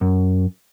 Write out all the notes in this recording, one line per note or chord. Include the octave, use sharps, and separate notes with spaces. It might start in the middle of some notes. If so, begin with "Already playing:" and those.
F#2